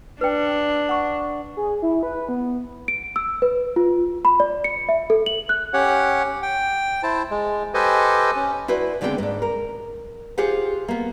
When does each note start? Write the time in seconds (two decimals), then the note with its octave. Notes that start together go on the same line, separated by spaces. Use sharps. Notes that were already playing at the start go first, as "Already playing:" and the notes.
0.21 D4 B4 G5
0.89 F#5 C#6
1.57 G#4
1.82 E4
2.03 B4
2.29 B3
2.88 D7
3.16 E6
3.42 B4
3.76 F4
4.25 B5
4.40 D5
4.64 C#7
4.89 E5
5.10 A4
5.26 F#7
5.49 F#6
5.73 C#4 G4 C#5 F#5
6.42 G5
7.03 E4 C5 A5
7.31 G#3
7.74 G4 A4 B4 C5 D#5 G#5
8.36 C#4
8.68 E4 F#4 B4 C5 D5
9.01 D#2 D3 G#3 B3 C4 G5
9.18 G#2 D4
9.42 A#4
10.38 F4 G4 G#4 C5 F#5
10.88 A#3 B3